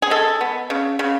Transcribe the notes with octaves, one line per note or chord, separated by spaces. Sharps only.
G#4
G#3 A4
B3
C#3
C#3